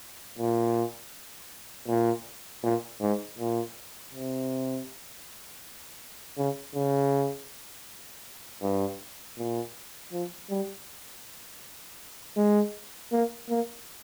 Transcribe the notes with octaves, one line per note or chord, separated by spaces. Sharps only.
A#2
A#2
A#2
G#2
A#2
C3
C#3
C#3
G2
A#2
F3
G3
G#3
A#3
A#3